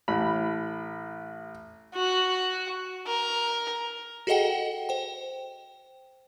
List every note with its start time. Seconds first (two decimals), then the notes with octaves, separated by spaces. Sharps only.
0.08 A1 B5
1.94 F#4
3.06 A#4
4.27 F#4 G#4 A4 D#5 F#5 G5
4.89 C5 G5